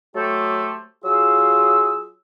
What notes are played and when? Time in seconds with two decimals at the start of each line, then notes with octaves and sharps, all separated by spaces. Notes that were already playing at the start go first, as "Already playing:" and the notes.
0.16 F#3 A3 G4 A4 C5
1.05 F#3 F4 G#4 E6